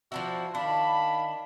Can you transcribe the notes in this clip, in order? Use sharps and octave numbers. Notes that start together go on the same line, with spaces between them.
F3 D4 E4 F#4
D#3 D4 F5 A5 B5